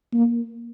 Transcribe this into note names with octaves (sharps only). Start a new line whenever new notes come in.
A#3